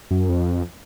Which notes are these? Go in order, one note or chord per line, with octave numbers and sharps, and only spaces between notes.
F#2
F2